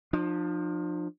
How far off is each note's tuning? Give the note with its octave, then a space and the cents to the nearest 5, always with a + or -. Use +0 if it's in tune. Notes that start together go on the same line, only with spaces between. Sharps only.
F3 +20 D4 +45